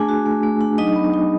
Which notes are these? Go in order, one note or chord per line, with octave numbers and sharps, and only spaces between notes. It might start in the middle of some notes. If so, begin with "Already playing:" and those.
Already playing: A3 D4 G#4 G#5
F#4
A3
A3
D4
F#3 D#4 D#5
B3
D#4